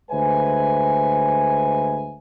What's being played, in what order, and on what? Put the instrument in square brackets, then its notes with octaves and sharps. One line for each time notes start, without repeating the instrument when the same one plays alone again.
[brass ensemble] D2 G#3 B4 C5 E5 G#5